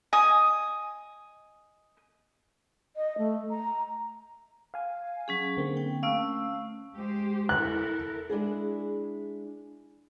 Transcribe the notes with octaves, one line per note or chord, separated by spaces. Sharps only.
D#5 G#5 D#6
D#5
A3
A#5
F5 G#5
F#3 C#4 G#4
D3 A#3 C4
G5
A3 C#4 F5 E6
G#3 G4 C5
E4 A4 A#4 F#6
G#3 D4 E4 G#4